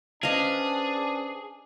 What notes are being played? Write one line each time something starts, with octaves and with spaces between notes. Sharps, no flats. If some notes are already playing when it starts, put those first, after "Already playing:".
C#4 D4 G#4 B4 C5 D#5 F5